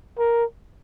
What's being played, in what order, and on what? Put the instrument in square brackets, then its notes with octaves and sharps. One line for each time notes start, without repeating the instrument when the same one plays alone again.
[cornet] A#4